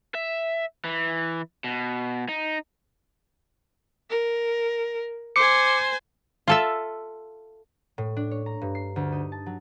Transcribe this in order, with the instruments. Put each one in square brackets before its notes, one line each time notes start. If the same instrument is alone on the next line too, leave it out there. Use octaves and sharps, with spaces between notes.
[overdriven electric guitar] E5
E3
B2
D#4
[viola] A#4
[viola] C5 G#5 [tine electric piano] D6 C#7
[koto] F4 A4 E5
[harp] A2
D4
C#5
A#5
G2
C7
D2
D#4
A5
F#3